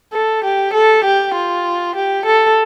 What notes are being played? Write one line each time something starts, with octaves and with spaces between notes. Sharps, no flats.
A4
G4
A4
G4
F4
G4
A4